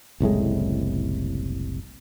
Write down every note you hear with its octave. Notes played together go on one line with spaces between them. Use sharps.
F#1 C2 A2 G#3